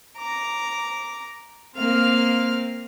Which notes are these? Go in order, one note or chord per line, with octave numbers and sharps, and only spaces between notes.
A#5 D6
A#3 C4 F5 F6